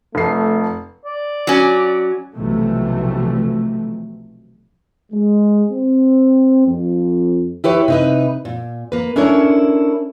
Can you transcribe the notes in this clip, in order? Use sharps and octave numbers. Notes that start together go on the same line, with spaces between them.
F1 A3 C7
D5
F#3 C#4
B1 C3 E3 F3 A3
G#3
C4
F2
E4 G4 B4 C#5
C3 D#4 B4
A#2
A#3 B4
C#4 D4 E4 A4 A#4 C#5